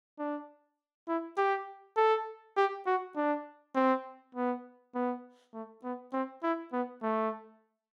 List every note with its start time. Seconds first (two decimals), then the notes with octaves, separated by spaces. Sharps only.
0.19 D4
1.08 E4
1.38 G4
1.97 A4
2.57 G4
2.87 F#4
3.16 D4
3.75 C4
4.35 B3
4.95 B3
5.54 A3
5.84 B3
6.13 C4
6.43 E4
6.73 B3
7.02 A3